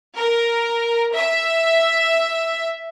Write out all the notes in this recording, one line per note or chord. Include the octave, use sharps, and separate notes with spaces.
A#4
E5